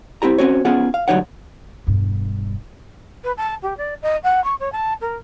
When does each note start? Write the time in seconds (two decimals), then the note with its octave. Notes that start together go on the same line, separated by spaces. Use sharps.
0.22 C4 E4 G4 A#5
0.38 C4 C#4 F#4 C#5
0.65 B3 C#4 F4 G#4 F#5
0.94 F5
1.08 D2 F#3 G3 D#4 C#5 F#5
1.87 E1 G2
3.24 B4
3.37 A5
3.62 G4
3.77 D5
4.02 D#5
4.23 F#5
4.44 C#6
4.60 C#5
4.72 A5
5.01 A#4